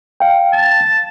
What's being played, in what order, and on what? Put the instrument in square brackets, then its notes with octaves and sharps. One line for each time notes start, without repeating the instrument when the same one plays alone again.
[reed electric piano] F5 G5
[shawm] A5